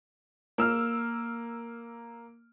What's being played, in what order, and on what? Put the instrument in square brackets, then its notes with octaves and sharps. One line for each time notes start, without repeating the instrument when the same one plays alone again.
[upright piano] A#3 E6 F6